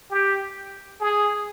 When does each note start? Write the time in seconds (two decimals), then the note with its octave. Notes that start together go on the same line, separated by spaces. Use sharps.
0.10 G4
1.00 G#4